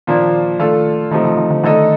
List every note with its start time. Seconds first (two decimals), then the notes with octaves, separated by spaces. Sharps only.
0.07 A#2 D#3 F3 A#3 D4
0.59 D#3 A3 D4 F4 A4
1.11 C3 D#3 F3 A3 D#4
1.25 D#3
1.37 D#3
1.51 D3
1.63 D3 D#3 A3 D#4 A4 D#5